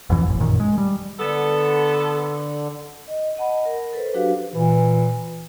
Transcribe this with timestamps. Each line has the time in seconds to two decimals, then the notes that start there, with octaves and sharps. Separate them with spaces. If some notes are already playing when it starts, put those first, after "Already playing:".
0.10 A1 F2 E3
0.26 E1 A1
0.41 F#2 A#2 D#3
0.60 G#3
0.78 G3
1.19 D3 B3 A4
3.08 D#5
3.37 D#5 F#5 A5 B5
3.66 A#4
3.93 A4 B4 C5
4.14 F#3 D4 F#4 G4 B4 F5
4.54 A#2 E3